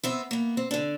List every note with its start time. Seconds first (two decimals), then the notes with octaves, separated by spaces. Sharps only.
0.03 B3 C4 E5
0.31 A#3 B3
0.57 C4
0.71 D3 D4